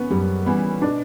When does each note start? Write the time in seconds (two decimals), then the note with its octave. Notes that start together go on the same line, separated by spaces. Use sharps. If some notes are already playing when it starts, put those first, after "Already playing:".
Already playing: B3 C#4
0.10 F#2 G3
0.46 E3 G3 B3 C#4
0.82 B2 D4